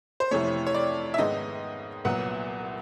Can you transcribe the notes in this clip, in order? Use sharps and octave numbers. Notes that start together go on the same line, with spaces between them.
C5
F2 C3 E3 A3 C#5
C#5
D5
E5
G#2 D#3 G#3 B3 D#5
C2 A#2 F#3 B3 F#5